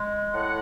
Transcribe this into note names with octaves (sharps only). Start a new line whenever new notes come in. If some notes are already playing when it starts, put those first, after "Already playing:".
Already playing: G#3
A2 F#5